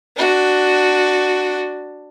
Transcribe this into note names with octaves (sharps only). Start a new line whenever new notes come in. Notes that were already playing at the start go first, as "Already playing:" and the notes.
D4 F#4